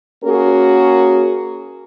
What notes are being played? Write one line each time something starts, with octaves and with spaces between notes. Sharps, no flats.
A#3 C#4 F#4 G#4 A#4